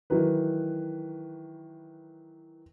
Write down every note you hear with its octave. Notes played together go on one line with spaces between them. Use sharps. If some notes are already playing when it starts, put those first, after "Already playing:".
D#3 E3 F#3 B4